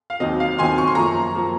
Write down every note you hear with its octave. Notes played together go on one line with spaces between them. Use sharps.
F5
D#2 D#3 F#3 C4 D#5
F5
D#2 D#3 F#3 C4 G#5 C6
C#6
C6
F#2 F3 A#3 A#5 C#6
F3 A#3